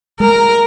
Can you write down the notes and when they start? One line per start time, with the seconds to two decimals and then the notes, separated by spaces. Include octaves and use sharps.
0.20 G#3 A#4